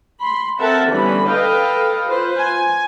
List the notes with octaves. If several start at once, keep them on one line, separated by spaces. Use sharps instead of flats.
B5 C6
C4 A4 A#4 E5 F#5 A5
D3 E3 G3 B3 C#4 B5
A4 B4 D#5 F5 G5
F4 B4 C5
G#5